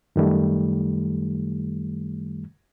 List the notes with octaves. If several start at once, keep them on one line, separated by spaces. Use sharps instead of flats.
F#2 D#3 G3 A3